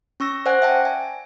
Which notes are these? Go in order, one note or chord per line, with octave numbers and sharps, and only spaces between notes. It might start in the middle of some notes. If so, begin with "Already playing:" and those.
C#4 C#6 E6 A#6
C5 D5 F#5 G#5 F#6 A#6
E5 G5 A5
G#5